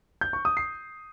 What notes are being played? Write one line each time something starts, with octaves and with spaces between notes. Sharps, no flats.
G6
C#6
D#6
C7